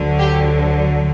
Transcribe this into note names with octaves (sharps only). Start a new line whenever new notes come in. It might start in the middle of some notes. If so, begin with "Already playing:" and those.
Already playing: D2 D3 F#3
G4